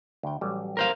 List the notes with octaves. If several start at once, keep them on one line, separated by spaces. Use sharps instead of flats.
D2 G5
A1 F#3 G3
A#4 C5 F5